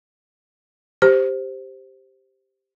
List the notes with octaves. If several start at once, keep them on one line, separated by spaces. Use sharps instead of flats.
G4 C5